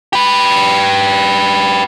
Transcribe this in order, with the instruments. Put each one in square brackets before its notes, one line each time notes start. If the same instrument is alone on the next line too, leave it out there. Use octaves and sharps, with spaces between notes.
[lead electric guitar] G4 B4